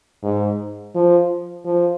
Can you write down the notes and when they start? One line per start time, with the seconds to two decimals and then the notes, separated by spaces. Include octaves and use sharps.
0.23 G#2
0.95 F3
1.65 F3